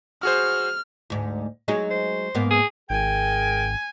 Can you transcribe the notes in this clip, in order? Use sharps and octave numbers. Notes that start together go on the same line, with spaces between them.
F#4 G#4 C5 F6
D2 G#2
F#3 G#3 D#4
C5
G#2 A#3 B3
G#4
G#1 G#4 A#4 G5 G#5